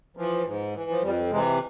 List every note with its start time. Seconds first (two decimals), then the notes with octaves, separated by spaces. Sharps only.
0.17 E3 F3
0.46 G#2
0.75 E3
0.90 F3
1.03 F2 G3
1.31 C3 E3 G#3